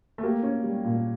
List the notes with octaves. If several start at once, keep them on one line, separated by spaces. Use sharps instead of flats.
A3
A#3 G4
C#4
G3
A#2